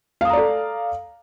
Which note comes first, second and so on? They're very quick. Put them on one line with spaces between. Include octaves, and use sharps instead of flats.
F5 D#6 A#5 D5 A4